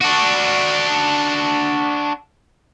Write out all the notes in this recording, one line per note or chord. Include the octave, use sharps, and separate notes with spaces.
D4 F#4